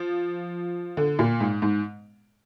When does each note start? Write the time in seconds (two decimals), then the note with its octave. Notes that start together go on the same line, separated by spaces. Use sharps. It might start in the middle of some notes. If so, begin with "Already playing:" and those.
Already playing: F3
0.97 D3
1.19 A#2
1.41 G#2
1.62 G#2